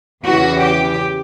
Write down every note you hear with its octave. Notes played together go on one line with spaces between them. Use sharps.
E2 C#3 E3 F#4
G4